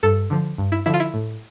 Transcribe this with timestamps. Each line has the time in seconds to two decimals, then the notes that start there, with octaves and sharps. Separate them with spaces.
0.03 G2 A4
0.30 D3 F3
0.58 G2
0.72 E4
0.86 D3 F3 E4
0.94 F4
1.00 E4
1.14 A2